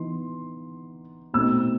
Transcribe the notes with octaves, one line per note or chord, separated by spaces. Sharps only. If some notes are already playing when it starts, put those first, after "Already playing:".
Already playing: E3 B3 D#4 C6
B2 A3 C4 D#4 E6